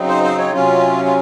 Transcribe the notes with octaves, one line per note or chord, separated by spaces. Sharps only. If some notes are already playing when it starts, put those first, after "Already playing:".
Already playing: C#3 F#3 C4 D#4
C5
C5
C#5
C3 F#3 C#4 F4
F4